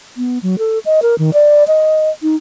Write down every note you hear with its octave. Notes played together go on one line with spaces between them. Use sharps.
B3
F#3
A4
D#5
A#4
D#3
D5
D#5
D#4